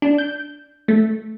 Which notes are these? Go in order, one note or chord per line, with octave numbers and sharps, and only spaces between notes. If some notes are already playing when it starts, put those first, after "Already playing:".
D4
G6
A3